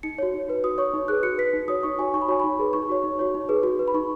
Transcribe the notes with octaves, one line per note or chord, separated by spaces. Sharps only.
D#4 C#7
F#4 C#5
D#4
F#4 B4
F#4 D#6
C#5 C#6
D#4
G#4 B4 F#6
F#4 C#7
B4 B6
D#4
F#4 C#5 D#6
D#4 C#6
F#4 C#5 G#5
D#4 C#6
B5
F#4 C#5 G#5
D#4 B5
G#4 B4
D#4 C#6
F#4 C#5
D#4
F#4 C#5
D#4
G#4 B4
F#4
B4
B5
D#4 C#6